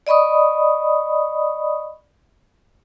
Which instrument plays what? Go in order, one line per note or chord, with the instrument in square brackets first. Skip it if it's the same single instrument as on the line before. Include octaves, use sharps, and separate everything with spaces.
[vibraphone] D5 D#5 B5 C#6 D#6